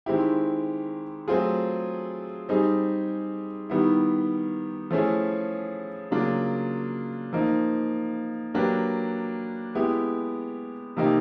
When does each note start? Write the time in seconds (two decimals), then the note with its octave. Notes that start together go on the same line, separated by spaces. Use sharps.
0.06 D#3 G#3 C4 E4 G4
1.28 F#3 A3 C4 F4 G#4
2.49 G3 C4 D#4 G#4
3.70 D#3 G3 B3 E4
4.91 F3 A3 C#4 E4 G#4
6.11 C#3 F#3 A#3 D4 F4
7.33 F3 A#3 D#4
8.54 F#3 A#3 D4 G4 B4
9.75 G#3 B3 E4 G4
10.97 C3 F3 A#3 D#4 G4